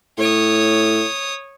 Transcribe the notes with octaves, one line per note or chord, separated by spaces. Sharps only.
A2 C#5 D#6